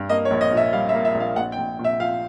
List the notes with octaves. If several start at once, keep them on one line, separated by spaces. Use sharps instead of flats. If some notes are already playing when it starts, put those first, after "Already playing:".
Already playing: G2
A#3 D#5
C#5
A#1
D#5
A#2 E5
G3 F5
E5
A#3
E5
A#1
F5
A#1 F#5
G5
A#1
A#2
E5
F3 F5